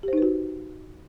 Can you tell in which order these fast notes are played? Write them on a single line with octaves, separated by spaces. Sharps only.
G4 C5 D#4 B4 F#4